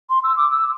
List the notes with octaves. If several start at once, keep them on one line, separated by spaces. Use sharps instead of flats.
C6
E6
D6
E6